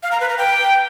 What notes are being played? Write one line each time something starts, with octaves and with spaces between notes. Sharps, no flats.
F5
A#5
B4
A#5
G5